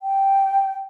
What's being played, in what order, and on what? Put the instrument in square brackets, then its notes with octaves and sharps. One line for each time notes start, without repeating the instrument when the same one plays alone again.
[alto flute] G5